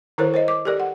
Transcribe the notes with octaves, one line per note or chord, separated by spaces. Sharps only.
D#3 E4 A4 A#4 C5 C#5
C5 C#5 D#5
D6
G4 A4 A#4 D5
F#5